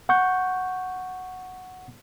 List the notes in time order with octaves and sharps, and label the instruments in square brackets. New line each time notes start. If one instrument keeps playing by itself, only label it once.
[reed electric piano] F#5 C#6 G6